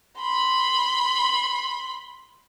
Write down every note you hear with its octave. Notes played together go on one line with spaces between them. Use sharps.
B5 C6